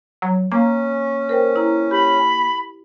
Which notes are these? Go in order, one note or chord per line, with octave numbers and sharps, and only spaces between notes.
F#3
A#3 C#4 A#5
A#4 C5 G5
E4 A#5
G4 B5